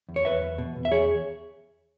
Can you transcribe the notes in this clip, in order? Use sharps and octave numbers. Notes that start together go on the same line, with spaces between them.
E2
C#5
E2 B4 E5
E2
B2
E2
E5
E2 G#4 C#5